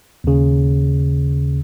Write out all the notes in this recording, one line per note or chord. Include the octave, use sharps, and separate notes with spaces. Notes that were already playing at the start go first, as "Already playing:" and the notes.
D#2 C#3